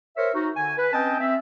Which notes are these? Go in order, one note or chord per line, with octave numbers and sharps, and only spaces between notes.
A#4 C5 C#5 E5
D#4 F#4
D3 G#5
B4
C4 C#4 D#5 G5 A5
C4 E5